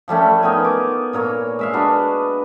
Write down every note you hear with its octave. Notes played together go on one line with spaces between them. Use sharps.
F3 G3 A3 C#4
B3 D#4 A#4 G#5
D6
A#2 A#4 C#5
G#3 E5 F5
D4 F#4 B4 D#5